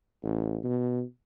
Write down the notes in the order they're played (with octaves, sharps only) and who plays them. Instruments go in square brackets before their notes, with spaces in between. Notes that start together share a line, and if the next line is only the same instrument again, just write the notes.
[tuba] A1
B2